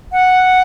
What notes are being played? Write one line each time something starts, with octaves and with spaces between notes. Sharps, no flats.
F#5